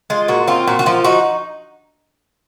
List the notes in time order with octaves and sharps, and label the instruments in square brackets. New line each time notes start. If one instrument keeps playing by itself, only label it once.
[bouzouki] G#3 F4
A#2 F#4
C4 F4
A#2 F#4
F#4
F3 F4
D#4 F#4